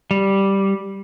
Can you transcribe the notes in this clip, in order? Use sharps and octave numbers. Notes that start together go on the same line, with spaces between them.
G3